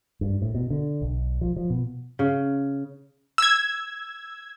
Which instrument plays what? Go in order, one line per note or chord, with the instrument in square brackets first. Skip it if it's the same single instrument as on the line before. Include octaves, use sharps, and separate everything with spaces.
[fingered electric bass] G2
A2
B2
D3
B1
F3
F3
B2
[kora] C#3
[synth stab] E6 G#6